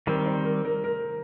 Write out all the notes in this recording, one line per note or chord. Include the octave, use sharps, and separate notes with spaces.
D#3 G3 C4 A#4
C5
A#4
A#4
A#4